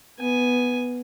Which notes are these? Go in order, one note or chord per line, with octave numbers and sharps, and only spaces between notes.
B3 G#5